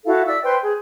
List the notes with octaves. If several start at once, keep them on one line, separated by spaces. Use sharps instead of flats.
E4 F#4 A4 F5
D5 E5 E6
B4 C5 G5 C6
G#4